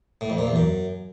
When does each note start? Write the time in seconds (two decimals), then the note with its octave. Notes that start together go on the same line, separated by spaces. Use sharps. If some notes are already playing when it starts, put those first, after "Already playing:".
0.21 A2
0.30 F2
0.39 A#2
0.47 E2
0.56 F#2